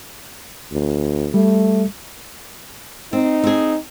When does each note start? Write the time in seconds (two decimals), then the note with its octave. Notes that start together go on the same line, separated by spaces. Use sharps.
0.72 D2
1.34 G3 A3
3.13 C4 D#4
3.44 C4 G#4